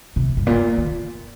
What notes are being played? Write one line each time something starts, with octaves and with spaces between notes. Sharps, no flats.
C3
G2
A#2
D#3